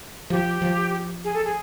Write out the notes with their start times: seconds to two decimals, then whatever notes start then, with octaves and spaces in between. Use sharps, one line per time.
0.30 F3 G4
0.62 F3
1.24 G#4
1.34 A4
1.45 G#4